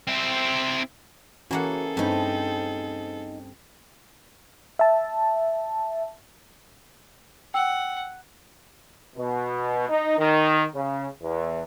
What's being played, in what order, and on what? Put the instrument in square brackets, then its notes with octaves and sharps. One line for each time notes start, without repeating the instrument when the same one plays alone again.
[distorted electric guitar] C4 E4
[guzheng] E3 A#3 F#5 [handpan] C#4 [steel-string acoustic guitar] F#4 [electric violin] G#4 A4
[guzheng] G2 A3 [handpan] C4 [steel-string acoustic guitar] D#4 B4
[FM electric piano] E5 A5
[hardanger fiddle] F#5 [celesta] G5 E6
[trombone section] B2
D#4
D#3
C#3
E2